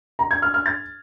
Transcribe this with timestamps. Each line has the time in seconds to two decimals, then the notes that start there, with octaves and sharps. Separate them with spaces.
0.19 A#5
0.31 G#6
0.42 F6
0.54 F6
0.66 A6